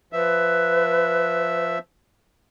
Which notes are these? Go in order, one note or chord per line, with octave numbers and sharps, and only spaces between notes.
F3 B4 E5